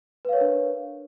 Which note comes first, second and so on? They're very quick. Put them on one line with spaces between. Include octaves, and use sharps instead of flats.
B4 F5 C#5 A#4 D4